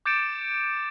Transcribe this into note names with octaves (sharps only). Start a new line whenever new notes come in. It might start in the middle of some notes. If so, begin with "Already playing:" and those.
D6 G6 A6 C#7 D7 E7